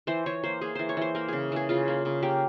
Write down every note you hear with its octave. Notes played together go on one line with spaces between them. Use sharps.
E3 C5
E3 C#5
A#3 C5
A#3 G#4
E3 C5
C#5
E3 C5
A#3 A#4
C#3 G#4
E3 G#4
C#3 F4
A#3
C#3
A#3 G4